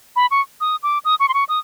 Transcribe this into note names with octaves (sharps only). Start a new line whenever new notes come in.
B5
C#6
D#6
D6
D#6
C#6
C6
C#6
D#6